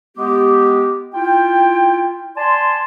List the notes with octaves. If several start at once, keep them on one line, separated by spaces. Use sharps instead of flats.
G#3 B3 G4
E4 F4 G5
D5 G#5 A5 C6